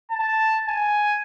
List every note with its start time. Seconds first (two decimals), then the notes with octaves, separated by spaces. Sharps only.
0.11 A5
0.68 G#5